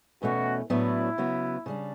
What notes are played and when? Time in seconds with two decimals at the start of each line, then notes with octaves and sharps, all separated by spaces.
0.22 E2 B2 A3 C#4 F#4
0.69 A2 F#3 B3 D4 E4 F#4
1.18 C#3 F#3 B3 F#4
1.66 C#3 G3 D4